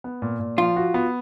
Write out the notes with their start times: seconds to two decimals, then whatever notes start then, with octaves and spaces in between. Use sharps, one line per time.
0.04 B3
0.22 A#2
0.40 A#2
0.58 F3 F4
0.76 F#4
0.94 B3